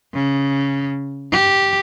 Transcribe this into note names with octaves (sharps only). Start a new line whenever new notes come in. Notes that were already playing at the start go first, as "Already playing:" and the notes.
C#3
G4